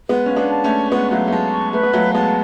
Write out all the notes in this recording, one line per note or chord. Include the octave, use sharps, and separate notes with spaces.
G#3 B3 B4
C#4 F5
B3 D4
A5
A3 C#4
C#6
G#3 B3 B4
F#3 A3 F5
A3
G#3 A5
C#6
A3 B4
B3
F#3 A3 F5
G#3 B3 A5